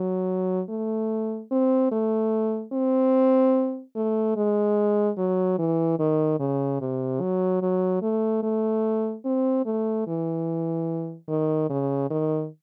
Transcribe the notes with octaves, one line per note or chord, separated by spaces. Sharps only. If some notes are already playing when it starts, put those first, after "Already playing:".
Already playing: F#3
A3
C4
A3
C4
A3
G#3
F#3
E3
D#3
C#3
C3
F#3
F#3
A3
A3
C4
A3
E3
D#3
C#3
D#3